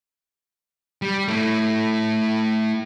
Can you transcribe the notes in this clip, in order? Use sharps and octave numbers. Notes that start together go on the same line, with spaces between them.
G3
A3 E4